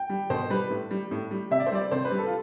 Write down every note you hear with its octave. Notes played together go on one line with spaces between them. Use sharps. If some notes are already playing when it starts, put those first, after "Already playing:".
Already playing: G5
G3
B2 C5
G3 B4
A2
G3
A2
G3
C3 E5
D5
C5
G3 D5
C3 C5
B4
G3
A4
F4